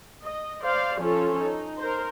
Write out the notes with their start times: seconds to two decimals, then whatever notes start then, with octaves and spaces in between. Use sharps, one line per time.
0.23 D#5
0.63 C5 D5 F5
0.99 F3 C#4 F4 A4 C#5
1.41 D#4
1.79 A#4 C5